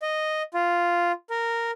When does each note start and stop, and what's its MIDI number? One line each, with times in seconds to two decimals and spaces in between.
0.02 0.42 75
0.54 1.12 65
1.30 1.71 70